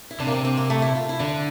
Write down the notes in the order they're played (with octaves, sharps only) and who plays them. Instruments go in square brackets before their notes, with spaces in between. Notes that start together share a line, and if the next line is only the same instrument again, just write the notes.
[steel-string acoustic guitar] E4
[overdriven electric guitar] C3 [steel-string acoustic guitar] D4
[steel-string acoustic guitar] A#3
C4
C4
A#3
A3
E4
F4
E4
[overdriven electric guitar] D3 [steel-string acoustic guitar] D4